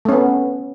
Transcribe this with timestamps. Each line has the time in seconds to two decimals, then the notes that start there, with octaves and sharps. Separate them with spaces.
0.05 A3
0.09 C#4
0.12 B3